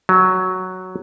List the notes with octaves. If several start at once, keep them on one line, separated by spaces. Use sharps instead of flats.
F#3